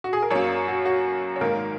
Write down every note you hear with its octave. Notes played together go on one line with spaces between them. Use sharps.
F#4
G#4
A#4
F#2 F#3 A#3 C#5
F#4
F#4
C#5
G#2 D#3 A#3 A#4